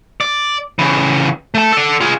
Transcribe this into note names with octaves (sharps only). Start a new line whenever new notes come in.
D5
C#3 E3
A3 A5
A4 D5
F4 G#4